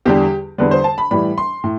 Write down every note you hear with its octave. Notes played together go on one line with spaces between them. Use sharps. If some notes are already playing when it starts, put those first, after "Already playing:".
E2 D3 G3 G4
E2 D3 G3 B4
C5
A5
B5
A2 E3 G3 B5
C6
A2